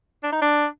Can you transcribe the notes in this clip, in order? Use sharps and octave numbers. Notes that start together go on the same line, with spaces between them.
D4
D#4
D4